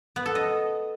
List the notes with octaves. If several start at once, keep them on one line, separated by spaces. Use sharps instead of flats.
B3
A4
D#5